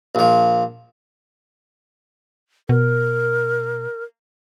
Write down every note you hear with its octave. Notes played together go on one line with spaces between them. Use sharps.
A#1 F3
B2 A#4